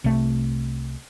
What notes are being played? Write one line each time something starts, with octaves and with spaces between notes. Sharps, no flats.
C2 C3 A3